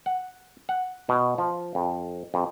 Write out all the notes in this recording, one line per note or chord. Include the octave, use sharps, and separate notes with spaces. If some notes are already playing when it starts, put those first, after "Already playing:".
F#5
F#5
B2
F3
F2
F2